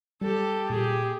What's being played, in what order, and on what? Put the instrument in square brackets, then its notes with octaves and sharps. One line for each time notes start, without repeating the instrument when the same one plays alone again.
[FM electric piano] G3 [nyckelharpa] G4 A4
[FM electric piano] A#2 [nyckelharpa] G4 G#4